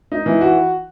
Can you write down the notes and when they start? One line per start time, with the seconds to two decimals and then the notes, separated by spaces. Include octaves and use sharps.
0.12 D#4
0.26 E3
0.41 F#4